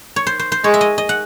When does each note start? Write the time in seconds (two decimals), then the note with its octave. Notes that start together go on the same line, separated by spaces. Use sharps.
0.16 C#5
0.27 C5
0.39 C5
0.52 C5
0.64 G#3 C#5
0.74 E5
0.81 D#5
0.98 D#5
1.09 F#5